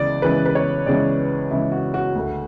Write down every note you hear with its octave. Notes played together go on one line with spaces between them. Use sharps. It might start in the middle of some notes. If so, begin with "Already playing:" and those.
Already playing: C#2 C#3 E3 D5
C#2 C#3 E3 B4
B4
C#5
C#2 C#3 E3 D5
C#2 C#3 E3 E4
F#4
F#4
D2 D3 A3